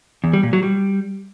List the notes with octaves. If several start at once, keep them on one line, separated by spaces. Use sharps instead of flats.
E2
G3
A#2
F#3
G3